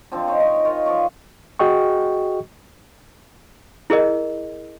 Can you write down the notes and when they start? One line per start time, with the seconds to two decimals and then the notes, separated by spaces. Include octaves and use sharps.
0.12 D3 F3 C4 D4
0.28 D#4 C5 C#5
0.40 D#4 G4 G#5
0.65 F4 A#4 C#5 D#5
0.86 F3 D5 C#6
1.59 F#4 G#4 D#5 G5 C#6
3.90 E4 G#4 A#4 D#5